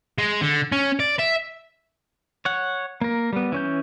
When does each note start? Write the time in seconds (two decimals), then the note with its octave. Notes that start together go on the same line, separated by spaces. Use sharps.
0.18 G#3
0.41 D3
0.72 C#4
1.00 D5
1.19 E5
2.45 C#5 F#5
3.01 A#3 A#4
3.33 G3 B3
3.52 E3 C#4 G6